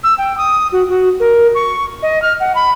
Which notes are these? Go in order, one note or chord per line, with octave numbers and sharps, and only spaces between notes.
E6
G5
D#6
F#4
F#4
A#4
C#6
D#5
F6
F#5
B5